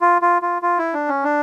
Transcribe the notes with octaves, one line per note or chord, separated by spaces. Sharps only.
F4
F4
F4
F4
E4
D4
C#4
D4